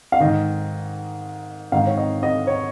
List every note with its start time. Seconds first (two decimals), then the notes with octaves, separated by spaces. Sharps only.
0.12 F5
0.20 G#2 D#3 D#5
1.72 G#2 D#3 F5
1.87 C#5
1.98 D#5
2.23 D#5
2.47 C#5